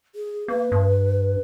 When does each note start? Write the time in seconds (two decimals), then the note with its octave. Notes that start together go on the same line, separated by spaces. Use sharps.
0.15 G#4
0.48 A#3 B4
0.72 G2